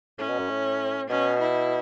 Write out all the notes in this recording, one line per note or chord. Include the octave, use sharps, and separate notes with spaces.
A2 C#4
B2
F#2
A2
B2 C#4
E4